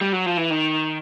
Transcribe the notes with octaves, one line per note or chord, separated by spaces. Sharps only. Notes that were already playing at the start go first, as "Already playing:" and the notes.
G3
F#3
F3
E3
D#3